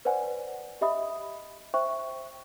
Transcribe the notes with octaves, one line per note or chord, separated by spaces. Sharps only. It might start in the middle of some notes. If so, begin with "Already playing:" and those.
B4 C5 D5 F#5 G#5
G4 D#5 E5 B5 D#6
C5 E5 G5 C#6